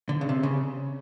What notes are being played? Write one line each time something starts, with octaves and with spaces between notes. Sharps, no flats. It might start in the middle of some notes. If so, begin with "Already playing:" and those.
D3
C#3
C3
C#3